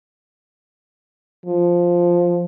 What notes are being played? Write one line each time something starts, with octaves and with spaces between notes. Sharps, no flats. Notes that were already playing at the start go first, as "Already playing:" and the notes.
F3